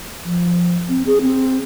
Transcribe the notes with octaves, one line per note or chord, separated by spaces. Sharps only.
F3
C4
G#4
C4